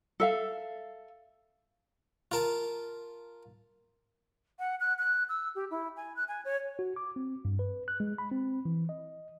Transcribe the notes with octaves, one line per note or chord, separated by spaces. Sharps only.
A4 E5 F5
F4 A#4 A5
F#5
F#6
F#6
E6
G4
E4
G#5
F#6
G#5
C#5
F#4
D6
C4
G2
B4
F#6
G#3
B5
C4
E3
D#5